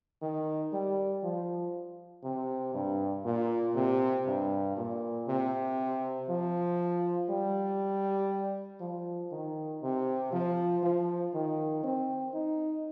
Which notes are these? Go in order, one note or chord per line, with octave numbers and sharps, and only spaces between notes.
D#3
G3
F3
C3
G2
A#2
C3
G2
A#2
C3
F3
G3
F3
D#3
C3
F3
F3
D#3
C4
D#4